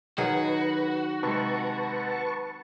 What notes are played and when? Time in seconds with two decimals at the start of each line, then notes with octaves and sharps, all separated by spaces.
0.18 D#3 F#3 F#4 G#4 B4
1.23 C3 G#3 B4 A5 C#6